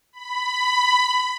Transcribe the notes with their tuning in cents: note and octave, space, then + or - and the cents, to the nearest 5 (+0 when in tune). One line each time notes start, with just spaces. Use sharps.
B5 +10